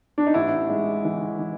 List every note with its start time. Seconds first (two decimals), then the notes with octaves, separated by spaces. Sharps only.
0.18 D4
0.27 D#4
0.34 A1 E4
0.69 G#3
1.05 E3
1.39 E3